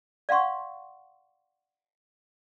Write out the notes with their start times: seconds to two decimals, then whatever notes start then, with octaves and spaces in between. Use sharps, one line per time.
0.29 D5 F5 F#5 C6 C#6